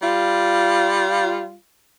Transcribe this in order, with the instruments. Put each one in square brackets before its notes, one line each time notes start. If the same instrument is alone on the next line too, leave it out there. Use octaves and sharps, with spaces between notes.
[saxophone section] G3 F4